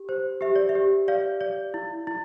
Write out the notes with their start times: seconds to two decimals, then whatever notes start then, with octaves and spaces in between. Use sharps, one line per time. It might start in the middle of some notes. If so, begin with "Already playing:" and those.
Already playing: G4
0.09 C5
0.41 G4 E5
0.56 D5
0.69 E5
0.75 G4
1.08 D5 F5
1.41 D5
1.74 E4
2.07 E4